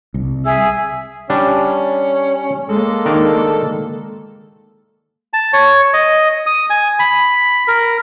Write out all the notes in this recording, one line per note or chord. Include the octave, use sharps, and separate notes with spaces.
C2
G#4 E5 E6
G3 C#4 D4
G#3 A#3 A4
D#3 D4 A#4
A5
C#5
D#5
D#6
G#5
B5
A#4